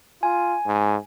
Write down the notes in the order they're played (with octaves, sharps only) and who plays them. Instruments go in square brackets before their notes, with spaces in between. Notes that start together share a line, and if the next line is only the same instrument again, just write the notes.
[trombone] F4 [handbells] G#5
[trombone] G#2